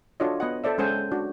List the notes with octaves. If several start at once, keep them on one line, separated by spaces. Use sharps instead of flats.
D4 F4 F#4 A4 C#5 D#5
B3 D#5 F#5
A4 C5 D5 E5
G#3 C#4 A4 C5 F#5 G#5
D4 F#4